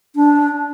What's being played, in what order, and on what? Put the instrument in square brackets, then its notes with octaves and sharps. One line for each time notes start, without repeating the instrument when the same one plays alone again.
[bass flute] D4